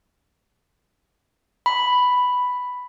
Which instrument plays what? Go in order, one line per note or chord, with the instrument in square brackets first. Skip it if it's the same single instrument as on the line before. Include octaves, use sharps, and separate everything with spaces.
[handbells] B5